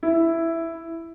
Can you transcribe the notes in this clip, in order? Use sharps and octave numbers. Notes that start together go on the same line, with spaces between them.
E4